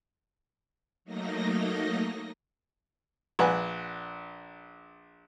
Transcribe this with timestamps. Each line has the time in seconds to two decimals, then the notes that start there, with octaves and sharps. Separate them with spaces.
1.05 F#3 A3 A#3 D#4 D#5 A#6
3.39 A#1 B4 F#5 G#5